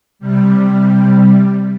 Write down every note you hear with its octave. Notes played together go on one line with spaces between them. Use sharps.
C3 G3